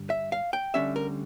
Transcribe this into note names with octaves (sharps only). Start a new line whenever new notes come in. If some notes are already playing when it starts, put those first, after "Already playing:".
Already playing: G2 D3 G3
E5
F5
G5
D2 D3 G3 C#4 E5
A#4